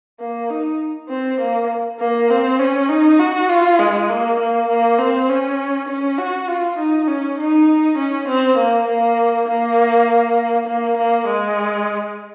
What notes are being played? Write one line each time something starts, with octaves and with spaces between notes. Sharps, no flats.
A#3
D#4
C4
A#3
A#3
C4
C#4
D#4
F#4
F4
G#3
A#3
A#3
A#3
C4
C#4
C#4
F#4
F4
D#4
C#4
D#4
C#4
C4
A#3
A#3
A#3
A#3
A#3
G#3